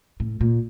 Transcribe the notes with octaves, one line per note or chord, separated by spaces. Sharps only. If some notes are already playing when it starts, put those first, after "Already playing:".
A2
A#2